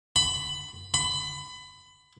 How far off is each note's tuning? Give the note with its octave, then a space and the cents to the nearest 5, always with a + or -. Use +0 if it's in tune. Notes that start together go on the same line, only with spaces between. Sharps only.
B5 +15
B5 +25